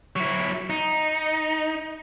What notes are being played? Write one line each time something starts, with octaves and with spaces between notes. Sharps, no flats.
F#3 E4
D#4